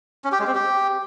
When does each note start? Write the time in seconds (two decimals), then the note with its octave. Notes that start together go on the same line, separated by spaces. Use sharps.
0.24 C#4
0.32 G4
0.40 G#3
0.47 C4
0.55 G4